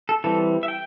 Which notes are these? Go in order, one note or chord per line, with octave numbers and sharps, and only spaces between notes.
A4
E3 G3 C4 A4
E5
G5